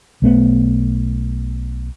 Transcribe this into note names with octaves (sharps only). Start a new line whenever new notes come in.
B1 A3 B3